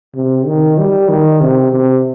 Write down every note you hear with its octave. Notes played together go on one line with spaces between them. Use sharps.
C3
D#3
G3
D#3
C3
C3